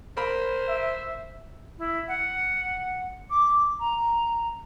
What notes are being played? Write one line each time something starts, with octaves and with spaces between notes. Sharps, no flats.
A#4 C5 B5
E5
E4
F#5
D6
A#5